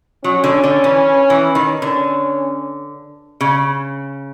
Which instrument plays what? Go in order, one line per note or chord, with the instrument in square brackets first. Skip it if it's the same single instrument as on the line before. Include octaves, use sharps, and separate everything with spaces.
[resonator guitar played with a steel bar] F#3 [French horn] C#4
[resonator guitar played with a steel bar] D3
D3
E3
E3
D#3
[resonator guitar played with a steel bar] D3 [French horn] C#4
[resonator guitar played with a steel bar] C#3